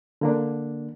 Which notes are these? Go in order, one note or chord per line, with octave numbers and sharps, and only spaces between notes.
D3 A#3 D4